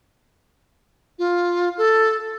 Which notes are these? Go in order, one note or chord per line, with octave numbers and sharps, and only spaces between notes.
F4
A4